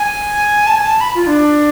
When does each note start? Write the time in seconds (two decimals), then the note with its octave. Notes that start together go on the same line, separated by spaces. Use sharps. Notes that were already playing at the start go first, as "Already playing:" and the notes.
Already playing: G#5
0.66 A5
0.76 G#5
0.85 A5
1.01 B5
1.15 F4
1.27 D4